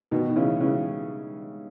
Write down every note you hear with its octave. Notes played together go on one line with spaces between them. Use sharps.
B2 D#3
D#3
C#3 E3
C#3 E3